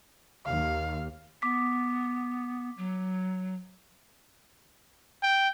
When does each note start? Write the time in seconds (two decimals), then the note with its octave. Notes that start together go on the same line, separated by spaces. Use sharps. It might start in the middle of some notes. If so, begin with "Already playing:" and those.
0.46 D#2 F5
1.42 B3 D6 B6
2.78 F#3
5.23 G5